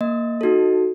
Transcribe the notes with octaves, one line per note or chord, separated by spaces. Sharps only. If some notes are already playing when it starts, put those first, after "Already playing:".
A#3 D#5
D#4 F#4 A4